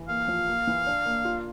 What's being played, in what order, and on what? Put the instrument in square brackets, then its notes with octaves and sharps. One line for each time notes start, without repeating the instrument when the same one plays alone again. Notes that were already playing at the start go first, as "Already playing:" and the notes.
Already playing: [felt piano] E3
[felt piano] A#3 [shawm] F5
[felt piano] F3
A#3
E3
D4
A#3
F4